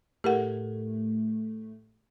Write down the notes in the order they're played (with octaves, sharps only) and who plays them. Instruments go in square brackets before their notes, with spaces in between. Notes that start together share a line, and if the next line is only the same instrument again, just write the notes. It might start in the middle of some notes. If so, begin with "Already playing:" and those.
[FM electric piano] A2 A3 [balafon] G4 A#4 F#5